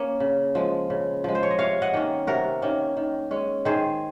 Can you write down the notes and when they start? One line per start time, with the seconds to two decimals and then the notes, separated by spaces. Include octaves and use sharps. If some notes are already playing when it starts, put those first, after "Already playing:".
Already playing: A#3 C#4 C#5
0.20 C#3
0.55 F3 G#3
0.90 C#3
1.24 F3 G#3
1.35 C5
1.43 C#5
1.51 D#5
1.58 C3 C#5 F5
1.82 D#5 F#5
1.93 D#3 A#3 C#4
2.27 C3 F#4 A#4
2.62 D#3 A#3 C#4
2.97 D#3
3.31 G#3 C#4
3.65 D#3 G#4 C5